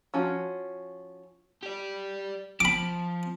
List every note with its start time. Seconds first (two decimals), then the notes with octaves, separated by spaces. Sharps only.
0.14 F3 C#4 F4 F#4
1.63 G4 D5
2.60 F3 B5 D6